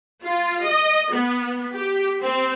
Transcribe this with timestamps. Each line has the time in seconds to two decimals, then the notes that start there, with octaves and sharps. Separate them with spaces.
0.24 F4
0.63 D#5
1.12 B3
1.74 G4
2.23 C4